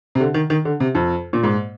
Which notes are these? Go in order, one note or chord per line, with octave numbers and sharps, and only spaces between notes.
C3
D3
D#3
D#3
D3
C3
F2
A#2
G#2